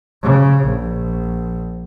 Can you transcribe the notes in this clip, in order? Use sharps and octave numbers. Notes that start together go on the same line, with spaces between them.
C#3
A#1